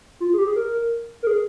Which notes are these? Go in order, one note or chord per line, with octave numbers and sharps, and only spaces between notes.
F4
G#4
G4
G#4
A#4
A#4
G#4